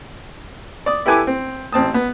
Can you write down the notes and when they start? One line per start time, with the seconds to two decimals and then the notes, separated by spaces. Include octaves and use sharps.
0.86 D5 D#6
1.06 E4 G4 A4 B4 G#5 D6
1.27 C4
1.72 A1 C4 A5 D#6
1.94 B3